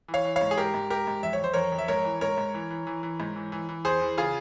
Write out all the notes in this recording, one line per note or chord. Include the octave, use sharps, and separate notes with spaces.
E3
C#5 F5
E3
C#5 F5
G#2
G#4
G#2 G4 A#4
G#2
G#2 G4 A#4
G#2
F2 E5
C#5
F2 C5
F2 A#4 C#5
F2
E5
G#2 A#4 C#5
E3
G#2 A#4 C#5
G#2
E3
E3
E3
E3
G#2
E3
E3
E3
E2 G#4 C5
E3
C#3 F4 G#4